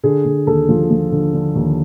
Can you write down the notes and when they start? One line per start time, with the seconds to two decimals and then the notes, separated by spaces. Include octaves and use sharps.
0.03 D3 G#4
0.25 D3
0.47 D#2 A4
0.69 F3
0.90 F3
1.12 D3
1.34 D3
1.55 D#2